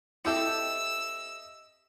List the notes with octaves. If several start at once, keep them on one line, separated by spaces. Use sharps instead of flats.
C4 E4 G4 A4 D#5 E5 E6